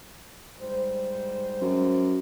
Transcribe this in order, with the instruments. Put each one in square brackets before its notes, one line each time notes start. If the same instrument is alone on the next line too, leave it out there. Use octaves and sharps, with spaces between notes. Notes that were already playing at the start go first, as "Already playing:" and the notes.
[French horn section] G#2 G3 C5
[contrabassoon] F#2